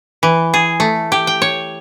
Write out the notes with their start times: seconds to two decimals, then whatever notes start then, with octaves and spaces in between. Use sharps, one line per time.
0.23 E3
0.54 G#4
0.80 A3
1.12 G4
1.27 G5
1.42 C#5